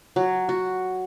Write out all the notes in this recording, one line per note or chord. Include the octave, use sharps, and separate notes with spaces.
F#3
F#4